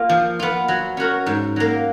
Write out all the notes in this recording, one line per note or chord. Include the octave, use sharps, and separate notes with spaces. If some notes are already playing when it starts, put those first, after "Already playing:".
Already playing: A#3 F4
F3
B3 F4
F#3
C#4 F#4 A#4
G#2
F#3 A#3